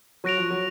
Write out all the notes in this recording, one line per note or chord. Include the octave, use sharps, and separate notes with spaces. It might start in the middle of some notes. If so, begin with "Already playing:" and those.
F#3 C#6 F#6 A#6 D7 F7
F3
F#3